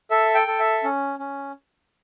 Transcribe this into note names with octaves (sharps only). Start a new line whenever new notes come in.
A4 E5
G5
A4
E5
C#4
C#4